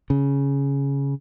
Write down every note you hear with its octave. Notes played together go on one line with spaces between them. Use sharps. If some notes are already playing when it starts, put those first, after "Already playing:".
C#3